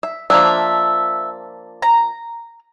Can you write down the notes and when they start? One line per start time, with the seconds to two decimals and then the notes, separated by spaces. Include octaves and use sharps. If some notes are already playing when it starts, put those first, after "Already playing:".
0.03 E5
0.30 F3 A#3 D4 E5
1.82 A#5